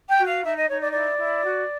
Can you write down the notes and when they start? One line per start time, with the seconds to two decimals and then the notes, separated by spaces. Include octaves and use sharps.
0.09 G5
0.18 F#4
0.26 F5
0.43 D#4 E5
0.55 D#5
0.68 D#4 C#5
0.80 D5
0.92 E4 D5
1.17 E4
1.43 F#4